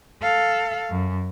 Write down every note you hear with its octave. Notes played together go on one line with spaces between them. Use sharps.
A4 F5
F#2